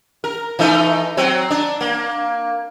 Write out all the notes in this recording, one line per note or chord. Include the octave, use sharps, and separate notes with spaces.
A#4
E3 A3 D#4
F#3 C4
D4
A#3